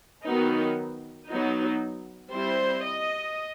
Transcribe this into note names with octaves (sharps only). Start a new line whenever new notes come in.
D#3 F#3 B3 D#4
F#3 B3 D#4
G3 C4 E4 C5
D#5